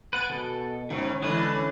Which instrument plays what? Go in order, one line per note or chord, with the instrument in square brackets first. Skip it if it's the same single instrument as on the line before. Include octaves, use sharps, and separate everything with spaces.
[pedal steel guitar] B4 F#5 [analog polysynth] G#5 A6 D7
[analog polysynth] B2 [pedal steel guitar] A4
[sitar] G#2 [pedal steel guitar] D#3 [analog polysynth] C#4 E4
[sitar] D3 E3 [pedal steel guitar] G#3 D4 B4